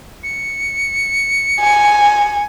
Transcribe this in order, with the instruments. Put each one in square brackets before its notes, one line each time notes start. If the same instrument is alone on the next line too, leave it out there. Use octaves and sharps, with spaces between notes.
[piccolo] C#7
[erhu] G#5